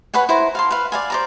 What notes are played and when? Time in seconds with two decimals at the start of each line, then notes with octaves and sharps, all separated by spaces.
0.14 B4 C#5 F#5 G#5
0.29 E4 C5 A#5
0.55 F5 A5 C6
0.71 B4 F5
0.92 D5 F5 G#5
1.10 C5 D5 A#5